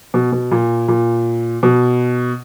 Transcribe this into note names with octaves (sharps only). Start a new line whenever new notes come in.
B2
B2
A#2
A#2
B2